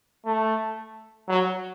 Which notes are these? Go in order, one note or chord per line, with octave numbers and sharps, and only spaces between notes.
A3
F#3